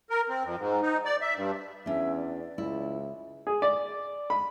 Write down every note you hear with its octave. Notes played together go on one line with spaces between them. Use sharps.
A#4
C4
F2
G#2
D#4
D5
E5
G2
E2 C#4 D4 E5
D5
C#2 E4
G#4
D5
B5